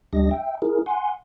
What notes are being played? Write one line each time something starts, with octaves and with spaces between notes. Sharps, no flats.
D2 G3 D4 G4 D#5 A#6
E5 G5
E4 G#4 A#4
F#5 G#5 C6